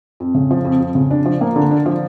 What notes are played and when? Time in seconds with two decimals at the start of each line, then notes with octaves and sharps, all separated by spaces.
0.20 F2
0.35 C#3
0.51 F3
0.65 F2
0.81 F2
0.95 C#3
1.11 D4
1.25 F3
1.41 A#3
1.56 D3
1.71 D4
1.86 F3